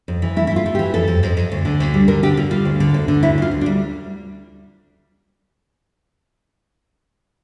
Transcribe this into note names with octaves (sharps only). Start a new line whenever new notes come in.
F2
E3
A3 E4
E4
A3
F4
A3
G4
E3
F2 A4
F2
F2
F2
D2
D3
D2
G3
D3 A#4
D3 G4
D3 F4
G3 F4
D2
D3
D2
D3
D2 E4
D2 F4
D2
D4
G3